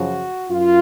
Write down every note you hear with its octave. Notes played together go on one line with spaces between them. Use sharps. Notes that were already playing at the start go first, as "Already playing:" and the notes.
Already playing: F#2 C#3 F3 F#4
F#2 F4